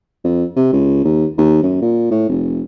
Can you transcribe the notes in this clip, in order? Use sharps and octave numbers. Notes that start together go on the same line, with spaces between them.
F2
C3
C#2
D#2
D#2
F#2
A#2
A2
F1